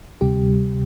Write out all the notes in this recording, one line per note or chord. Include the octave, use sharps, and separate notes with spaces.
D2 C3 G3 G4